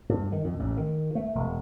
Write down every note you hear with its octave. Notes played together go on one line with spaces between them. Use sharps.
G2
D#3
F2
A1
D#3
A3
E1